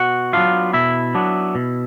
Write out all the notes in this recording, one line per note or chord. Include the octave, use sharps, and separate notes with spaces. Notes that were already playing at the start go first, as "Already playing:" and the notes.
Already playing: B2 F#4 F#5
F#3 B3 D4 F4 F5
B2 E4 E5
F#3 B3 D4
B2